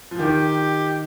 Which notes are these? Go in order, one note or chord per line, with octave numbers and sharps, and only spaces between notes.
F3
D#3 G4